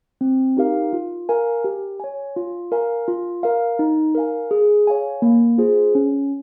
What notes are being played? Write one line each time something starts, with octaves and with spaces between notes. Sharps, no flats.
C4
D#4 G4 A#4 F5
F4
A#4 F5 G#5
G4
C#5 G#5
F4
A#4 F5 G#5
F4
A#4 F5
D#4
A#4 F5 G#5
G#4
C#5 F5 G#5
A#3
F4 G#4 C5
C#4